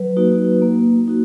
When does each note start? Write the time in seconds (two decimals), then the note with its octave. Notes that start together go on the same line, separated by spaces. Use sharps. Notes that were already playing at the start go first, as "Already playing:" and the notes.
Already playing: F#3 B4
0.17 A#3 D#4 F#4
0.62 A#3
1.08 D#4 F#4